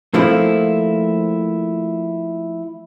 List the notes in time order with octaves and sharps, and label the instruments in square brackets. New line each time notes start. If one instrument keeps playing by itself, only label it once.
[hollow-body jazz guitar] F3 A3 A#3 C4 E4